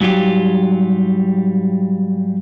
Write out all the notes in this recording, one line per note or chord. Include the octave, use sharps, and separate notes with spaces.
G#2 F#3 G3 F4 G4